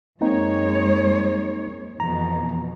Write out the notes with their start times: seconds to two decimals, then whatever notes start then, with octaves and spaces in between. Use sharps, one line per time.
0.21 F#2 G#3 A#3 C4 D#4 C#5
2.00 F2 B2 E3 A#5